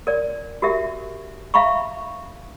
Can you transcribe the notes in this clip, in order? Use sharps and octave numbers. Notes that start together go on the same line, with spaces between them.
A#4 D5
F#4 G4 A#4 E5
E5 F5 A#5 B5 C#6